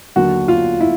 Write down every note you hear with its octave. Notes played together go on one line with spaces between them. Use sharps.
D#2 D3 F#3 F#4
F4
E4